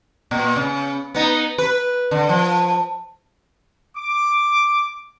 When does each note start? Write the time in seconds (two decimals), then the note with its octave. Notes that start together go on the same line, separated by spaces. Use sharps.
0.31 A#2
0.56 C#3
1.14 B3 D#4
1.58 B4
2.11 D3
2.29 F3
3.96 D6